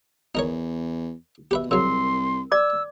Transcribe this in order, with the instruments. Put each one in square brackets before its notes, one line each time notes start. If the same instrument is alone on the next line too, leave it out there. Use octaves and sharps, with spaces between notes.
[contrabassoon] E2 [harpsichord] D#4 A#4 C#5
[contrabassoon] B2 [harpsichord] G4 B4 E5
[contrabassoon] C2 [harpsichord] C#3 F#3 [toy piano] A#4 [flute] C6
[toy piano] D5 D6 [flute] E6